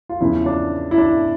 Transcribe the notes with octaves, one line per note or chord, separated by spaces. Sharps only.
F4
E2 C#3 F3 E4
D4
E4
D4